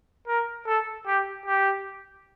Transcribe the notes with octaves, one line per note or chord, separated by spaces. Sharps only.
A#4
A4
G4
G4